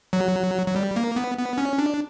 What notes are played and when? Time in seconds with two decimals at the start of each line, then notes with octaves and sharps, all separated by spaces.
0.13 F#3
0.67 F#3
0.76 G3
0.96 A#3
1.16 B3
1.38 B3
1.58 C#4
1.78 D4